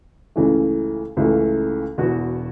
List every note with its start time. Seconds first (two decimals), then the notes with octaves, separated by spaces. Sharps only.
0.36 C#2 C#3 E3 A3
1.17 C#2 C#3 E3 A3
1.98 E1 E2 B2 B3 F#4